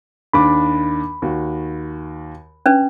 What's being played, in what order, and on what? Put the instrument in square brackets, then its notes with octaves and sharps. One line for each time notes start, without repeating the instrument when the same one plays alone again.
[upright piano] D#2 D4 D6 [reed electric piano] B5
[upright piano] D#2 F#4
[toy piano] C#4 D4 B4